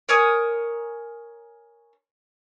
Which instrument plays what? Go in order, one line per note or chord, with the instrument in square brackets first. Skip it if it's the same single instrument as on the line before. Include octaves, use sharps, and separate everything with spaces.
[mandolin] A#4 C#5 G#5 D#6